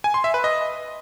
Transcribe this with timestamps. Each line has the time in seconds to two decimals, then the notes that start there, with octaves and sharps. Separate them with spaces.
0.04 G#5
0.14 C6
0.24 E5
0.34 B4
0.44 D#5